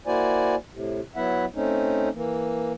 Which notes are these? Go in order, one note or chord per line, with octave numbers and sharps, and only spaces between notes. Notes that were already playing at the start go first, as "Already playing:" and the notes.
A#3 E4 F#4 C5 D5 G#5
A2 C3
F#3 B3 E4 E5 F#5
A3 C4 C#4 D#4
E3 A#3